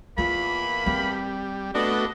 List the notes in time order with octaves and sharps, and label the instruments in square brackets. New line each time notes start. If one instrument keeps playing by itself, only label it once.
[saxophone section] E2 A#3 [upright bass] F4 [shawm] B5
[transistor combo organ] G3 [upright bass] C4
[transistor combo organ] A3 B3 F#4 [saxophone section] D4 [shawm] D#5